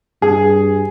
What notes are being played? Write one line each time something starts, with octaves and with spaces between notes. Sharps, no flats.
G2 G#4